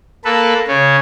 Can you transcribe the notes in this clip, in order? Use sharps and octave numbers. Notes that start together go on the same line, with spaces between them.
A#3 A4 B4
C#3 C#4